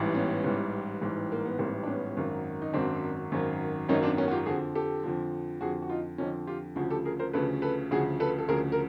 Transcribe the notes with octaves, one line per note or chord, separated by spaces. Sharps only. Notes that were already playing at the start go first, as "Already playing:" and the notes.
Already playing: A1 G#2 E3 G3
B3 C#4
A1 G#2 E3 G3
A1 G#2 E3 G3
A#3
B3
A1 G#2 E3 G3 A#3 C4
D4
B3 C#4
G#1 F#2 D#3 F#3
D#4
G#1 F#2 D#3 F#3 C4 D4
G#1 F#2 D#3 F#3
G#1 F#2 D#3 F#3 C#4 D#4
C4 D4
B3 C#4
F#4
F4 G4
F2 D3 F3 F#4 G#4
G4 A4
F2 D3 F3
F2 D3 F3 F#4 G#4
F#4
D#4 F4
F2 D3 F3 C#4 D#4
F4 G4
D2 C#3 F3 F#4 G#4
G4 A4
G#4 A#4
A#4 C5
D2 C#3 F3 A4 B4
A4 B4
D2 C#3 F3 F#4 G#4
A4 B4
A4
D2 C#3 F3 G#4 A#4
A#4